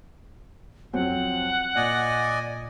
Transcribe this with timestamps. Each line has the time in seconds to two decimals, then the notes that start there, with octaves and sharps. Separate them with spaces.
0.93 F2 F#3 C4 F#5
1.76 A#2 D5 D#5 G#5